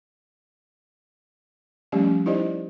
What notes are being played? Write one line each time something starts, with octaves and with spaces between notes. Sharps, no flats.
F3 G3 A3 C#4 G4
D#4 E4 G4 C5 D5 D#5